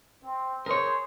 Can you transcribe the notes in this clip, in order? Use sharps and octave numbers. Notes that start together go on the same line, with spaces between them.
C4
G#4 A#4 C5 C#5